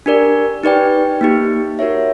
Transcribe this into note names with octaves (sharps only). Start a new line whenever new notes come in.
D4 G4 A#4 D5
D#4 G4 B4 D5 G5
A#3 D#4 G4
F#4 A#4 C#5 E5